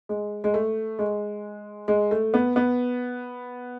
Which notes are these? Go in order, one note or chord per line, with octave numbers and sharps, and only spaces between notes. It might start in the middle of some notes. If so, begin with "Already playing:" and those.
G#3
G#3
A3
G#3
G#3
A3
B3
B3